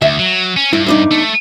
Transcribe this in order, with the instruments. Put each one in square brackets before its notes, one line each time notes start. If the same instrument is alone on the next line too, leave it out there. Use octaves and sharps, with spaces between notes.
[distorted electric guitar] D2 [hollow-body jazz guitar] E5
[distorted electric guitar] F#3
C#4
[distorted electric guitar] G2 [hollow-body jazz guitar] E4
[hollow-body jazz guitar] E2 D4 D#4
[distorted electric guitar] A3